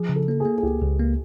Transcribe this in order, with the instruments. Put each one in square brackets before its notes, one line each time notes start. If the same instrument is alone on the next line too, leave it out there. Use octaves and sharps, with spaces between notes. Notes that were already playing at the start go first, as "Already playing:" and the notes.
Already playing: [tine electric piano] F3 [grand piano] G#4
[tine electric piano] C#3
[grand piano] A4
[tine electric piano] A#3 [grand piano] A4
[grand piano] G#4
[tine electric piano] A#3
[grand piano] G#4
[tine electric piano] C#2 [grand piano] G4
[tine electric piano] C#2
A#3